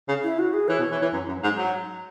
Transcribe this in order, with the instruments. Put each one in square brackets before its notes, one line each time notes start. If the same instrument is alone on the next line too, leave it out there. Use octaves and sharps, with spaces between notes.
[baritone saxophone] C#3
[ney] E4
F#4
G#4
[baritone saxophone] E3 [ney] C#5
[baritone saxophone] B2
E3
E3
F#2
F#2
G#2
F#3